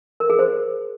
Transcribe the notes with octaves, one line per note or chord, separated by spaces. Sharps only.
A#4
G#4
C5